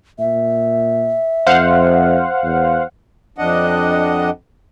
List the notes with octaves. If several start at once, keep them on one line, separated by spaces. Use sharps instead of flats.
A#2 E5
F2 C5 F5 F#5
E2
F2 D4 D#5 F#5